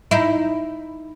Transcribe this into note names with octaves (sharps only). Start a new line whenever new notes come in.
D#4 E4